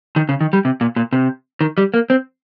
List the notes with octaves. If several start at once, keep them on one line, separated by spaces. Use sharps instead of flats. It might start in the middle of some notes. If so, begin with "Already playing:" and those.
D#3
C#3
D#3
G3
C3
A#2
A#2
C3
D#3
G3
A#3
C4